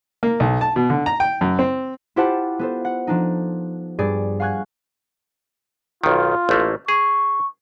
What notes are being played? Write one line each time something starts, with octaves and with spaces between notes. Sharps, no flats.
A#3
B1
A5
B2
D3
A#5
G5
F#2
C4
E4 F4 G4 C5 F#5 A5
B3 A4 C5
F#5
F3 D4 D#4
G2 G#4 D5
F5 F#5 G#5 C#6 F#6 G#6
B1 D#3 F4
A1 A3 A#3
G#4 C#6